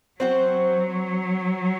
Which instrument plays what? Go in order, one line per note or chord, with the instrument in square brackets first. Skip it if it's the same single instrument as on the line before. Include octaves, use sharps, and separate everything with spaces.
[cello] F#3 [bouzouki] C4 F#4 C5